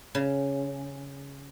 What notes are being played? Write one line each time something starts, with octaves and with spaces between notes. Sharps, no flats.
C#3